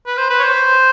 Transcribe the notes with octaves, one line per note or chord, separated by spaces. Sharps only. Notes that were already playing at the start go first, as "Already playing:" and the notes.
B4
C5
B4
C#5
C5